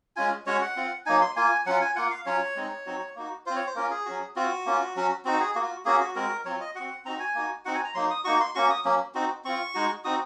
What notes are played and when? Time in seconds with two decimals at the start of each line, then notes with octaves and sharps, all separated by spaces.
0.16 G#3 C#4 F4 G#5
0.46 G#3 C#4 F#4 C#5
0.61 F#5
0.76 C4 F4
1.06 F#3 A#3 D#4 G#5
1.21 C6
1.36 A#3 F4 G#5
1.66 F#3 C#4 F4 F#5
1.81 G#5
1.96 A#3 F4 F#5
2.11 F5
2.26 F#3 C#4 F4 C#5
2.56 G#3 C4 D#4
2.86 F#3 C4 D#4 F#4
3.16 A#3 D#4 F#4
3.46 C4 F4 C5
3.56 C#5
3.66 C5
3.75 A#3 C#4 F4 A#4
3.91 G#4
4.06 F#3 C#4 F#4
4.36 C4 F4 F#4
4.66 A#3 C#4 F4
4.96 F#3 C#4 F#4
5.25 C4 D#4 F#4
5.40 G#4
5.55 A#3 F4 F#4
5.85 A#3 C#4 F#4 G#4
6.00 F#4
6.15 G#3 C4 F#4 A#4
6.45 F#3 C4 F4 C#5
6.60 D#5
6.75 C4 F#4 F#5
7.05 C4 D#4 F#4 A#5
7.20 G#5
7.35 A#3 D#4 F#4
7.65 C4 D#4 F#4 F#5
7.75 G#5
7.84 A#5
7.95 F#3 A#3 D#4 C6
8.10 D#6
8.24 A#3 D#4 F#4 C#6
8.40 C6
8.55 A#3 C#4 F#4 C#6
8.70 D#6
8.85 F#3 A#3 C#4
9.15 C4 D#4 F#4
9.45 C4 F4 C#6
9.74 G#3 D#4 F#4
10.05 C4 D#4 F#4 D#6